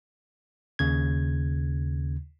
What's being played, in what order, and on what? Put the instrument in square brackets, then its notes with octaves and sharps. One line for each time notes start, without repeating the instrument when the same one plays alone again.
[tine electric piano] D#2 C#3 G#6